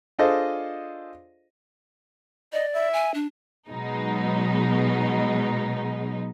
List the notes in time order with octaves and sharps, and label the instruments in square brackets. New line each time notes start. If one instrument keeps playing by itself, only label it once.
[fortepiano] D4 F4 G#4 A4 C5 D#5
[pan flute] D5 [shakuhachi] D#5
[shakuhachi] E5
[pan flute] G#5
D4
[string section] B2 F#3 G#3 D#4